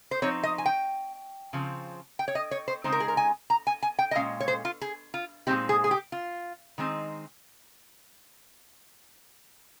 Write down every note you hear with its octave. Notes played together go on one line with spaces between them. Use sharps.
C5
F3 C4 D#4 C#5
D#5
G#5
G5
C#3 F3 C4
G5
C#5
D#5
C#5
C5
C#3 G#3 C4 D#4 C5
A#4
G#4
A#4
G#5
A#5
G#5
G#5
G5
D#5
A#2 G#3 C#4 F5
C#5
C5
F4
G#4
F4
A#2 G#3 C4 D#4 G4
G#4
G#4
G4
F4
D#3 G#3 C4 D#4